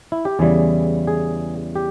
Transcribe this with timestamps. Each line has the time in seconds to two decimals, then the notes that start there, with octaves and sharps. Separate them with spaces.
0.12 E4
0.25 G4
0.39 E2 C#3 E3 G3 G#4
1.07 G#4
1.76 G4